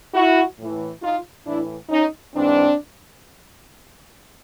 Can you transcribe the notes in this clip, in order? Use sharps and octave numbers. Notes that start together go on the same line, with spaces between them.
E4 F#4
A2 E3
D#4 F4
A2 E3 D4 E4
C#4 D#4
G#2 E3 C4 D4